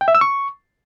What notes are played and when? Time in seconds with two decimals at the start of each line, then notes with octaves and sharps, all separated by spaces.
0.01 G5
0.08 E5
0.15 E6
0.21 C#6